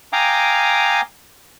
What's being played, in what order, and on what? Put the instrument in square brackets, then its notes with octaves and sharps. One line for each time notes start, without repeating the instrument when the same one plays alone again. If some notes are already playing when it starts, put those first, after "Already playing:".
[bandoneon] F5 G5 G#5 A#5 D6 D#6